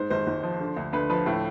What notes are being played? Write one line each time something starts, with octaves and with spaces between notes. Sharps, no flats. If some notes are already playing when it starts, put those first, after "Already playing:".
Already playing: G#2 C5
G#1 C5
G#1
F3
D3
D2
D2 B4
F3 B4
A2 A4